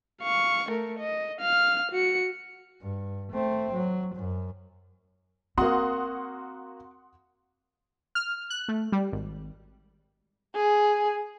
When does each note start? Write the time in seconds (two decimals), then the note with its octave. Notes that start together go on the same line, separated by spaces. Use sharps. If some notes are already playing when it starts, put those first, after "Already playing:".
0.22 F5 C#6
0.69 A3 A#4
0.99 D#5
1.41 F5 F6
1.92 F#4 C#7
2.81 G2
3.32 A3 C4
3.74 F#3
4.15 F#2
5.58 A#3 C4 F#4 F#5 C6 D#6
8.15 F6
8.50 F#6
8.68 A3
8.92 G3
9.12 G#1
10.55 G#4